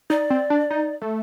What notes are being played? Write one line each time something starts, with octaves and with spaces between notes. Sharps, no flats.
D#4 D5
C4
D4
D#4
A3